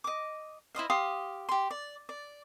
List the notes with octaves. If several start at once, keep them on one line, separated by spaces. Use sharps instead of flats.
D#5 D6
E4 C5 D#5 F5
G4 F5 C6 D#6
G4 C6
D5
D5